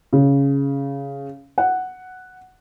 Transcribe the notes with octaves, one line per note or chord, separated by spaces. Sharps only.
C#3
F#5